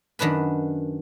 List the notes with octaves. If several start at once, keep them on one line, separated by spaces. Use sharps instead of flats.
F#2 D#3 D4 B4 B5